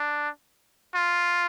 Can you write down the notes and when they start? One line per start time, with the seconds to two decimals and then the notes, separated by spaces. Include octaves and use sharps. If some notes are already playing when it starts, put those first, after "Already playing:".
Already playing: D4
0.95 F4